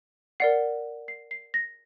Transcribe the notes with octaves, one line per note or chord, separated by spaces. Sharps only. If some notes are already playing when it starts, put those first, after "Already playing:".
A#4 D5 F#5 C7
C7
C7
A#6